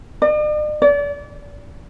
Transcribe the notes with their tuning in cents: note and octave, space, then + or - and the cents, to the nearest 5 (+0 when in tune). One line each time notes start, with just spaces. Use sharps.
D5 +45
D5 -35